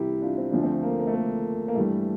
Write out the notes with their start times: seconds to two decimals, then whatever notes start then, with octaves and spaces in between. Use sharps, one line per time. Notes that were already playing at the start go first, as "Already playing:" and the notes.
Already playing: C2 C3 E3 E4 G4
0.22 D4 F4
0.38 C4
0.51 D2 D3 F3 D4
0.63 A3 C4
0.83 A#3
1.00 A#3
1.07 A3
1.14 A#3
1.68 A#3
1.75 G2 E3 G3 A3